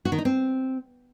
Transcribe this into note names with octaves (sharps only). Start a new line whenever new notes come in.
F#4
D#3
D#4
C4